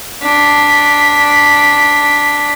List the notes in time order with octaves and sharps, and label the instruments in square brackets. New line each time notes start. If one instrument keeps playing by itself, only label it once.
[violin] D4 B6